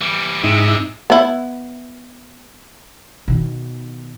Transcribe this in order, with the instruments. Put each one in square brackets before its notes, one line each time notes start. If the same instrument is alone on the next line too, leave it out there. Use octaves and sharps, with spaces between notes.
[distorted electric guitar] E3 G3
[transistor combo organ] G#2 D#4 E4 [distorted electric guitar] C3
[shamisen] B3 E4
[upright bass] B2 D#3